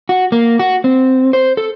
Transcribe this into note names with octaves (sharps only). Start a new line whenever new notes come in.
F#4
A#3
F#4
C4
C5
A4